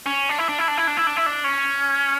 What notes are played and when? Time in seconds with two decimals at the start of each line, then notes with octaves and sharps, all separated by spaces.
0.06 C#4
0.29 D4
0.38 E4
0.49 D4
0.59 E4
0.68 D4
0.77 E4
0.87 D4
0.97 E4
1.07 D4
1.17 E4
1.26 D4
1.44 C#4